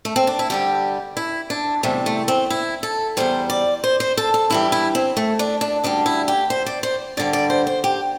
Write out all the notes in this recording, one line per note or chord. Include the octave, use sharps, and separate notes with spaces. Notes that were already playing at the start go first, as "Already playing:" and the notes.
A3
C4
D4
E4
G2 D3 G3 G4
E4
D4
E2 C3 G3 A3
A3
C4
E4
A4
E2 C3 G3 C5
D5
C5
C5
A4
A4
G2 E3 G3 E4
E4
C4
A3
D4
D4
D2 D3 G3 D4
E4
G4
C5
D5
C5
G2 D3 G3 D5
D5
C5
C5
G4